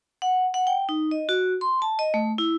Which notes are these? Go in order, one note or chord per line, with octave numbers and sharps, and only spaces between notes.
F#5
F#5
G5
D#4
D#5
F#4
C6
A5
D#5
A3
E4